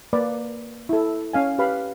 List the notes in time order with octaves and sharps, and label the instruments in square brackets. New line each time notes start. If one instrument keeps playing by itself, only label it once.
[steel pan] A#3 B4 D5 B5
E4 A4
C#4 F5 G#5
G4 B4 F5 B5